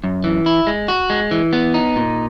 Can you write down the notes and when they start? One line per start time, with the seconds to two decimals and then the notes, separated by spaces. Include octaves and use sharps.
0.04 F#2
0.24 E3
0.46 E4
0.67 G#3
0.88 F#4
1.10 G#3
1.31 E3
1.53 B3
1.74 D#4
1.96 A#2